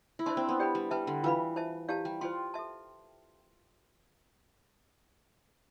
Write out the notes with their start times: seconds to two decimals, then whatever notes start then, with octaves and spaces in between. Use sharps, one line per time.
0.19 E4
0.26 D4 C5 E5 A5 C6
0.37 C4
0.49 B3
0.59 G4 D5 G5 B5
0.75 G3
0.91 G3 B4 E5 A5
1.07 D3
1.23 E3 F4 B4 F5 B5
1.56 C5 E5 A5
1.88 E4 G4 D5 F5 A5
2.05 G3
2.21 F4 C5 G5 C6
2.54 A4 E5 A5